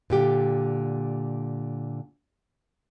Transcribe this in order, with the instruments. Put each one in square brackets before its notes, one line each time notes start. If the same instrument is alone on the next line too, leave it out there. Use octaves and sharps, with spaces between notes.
[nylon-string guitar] A#2 D3 G4